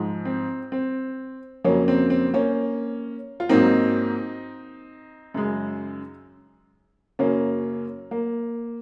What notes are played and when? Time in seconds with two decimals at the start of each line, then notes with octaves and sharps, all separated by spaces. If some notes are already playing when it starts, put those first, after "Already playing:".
Already playing: G#2 F3 G#3
0.25 C4
0.72 C4
1.64 F2 C#3 F#3 A#3 C#4
1.88 C4
2.10 C4
2.34 A#3 C#4
3.40 F4
3.49 G#2 F#3 A#3 C4 D#4
5.34 F#2 C#3 G#3
7.19 F#2 C#3 F#3 A#3 C#4
8.11 A#3